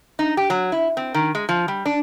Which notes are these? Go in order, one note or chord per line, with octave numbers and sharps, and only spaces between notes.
D#4
G4
F#3
E4
C4
D#3
G#3
F3
G3
D4